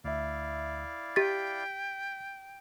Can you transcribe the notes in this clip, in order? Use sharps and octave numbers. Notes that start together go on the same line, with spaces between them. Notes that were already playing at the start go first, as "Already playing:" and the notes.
D2 E4 D5 E5 F5
G4 G5 A6 B6